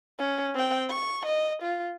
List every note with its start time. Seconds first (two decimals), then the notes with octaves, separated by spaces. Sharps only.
0.18 C#4
0.55 C4 G5
0.89 C#6
1.26 D#5
1.62 F4